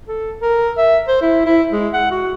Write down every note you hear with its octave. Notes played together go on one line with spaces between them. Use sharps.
A4
A#4
E5
C5
E4
E4
G#3
F#5
F#4